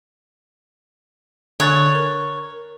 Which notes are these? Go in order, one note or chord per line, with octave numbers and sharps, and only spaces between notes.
D3 C#5 F#6 A6
A#4